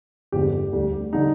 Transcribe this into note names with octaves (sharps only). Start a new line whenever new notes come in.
G1 F2 D3 G#3 G4
D2 D3 G3
D3 G3 D#4